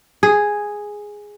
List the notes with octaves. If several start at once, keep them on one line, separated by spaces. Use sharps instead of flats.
G#4